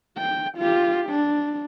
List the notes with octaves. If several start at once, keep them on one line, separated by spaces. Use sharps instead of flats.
G5
F4 G4
D4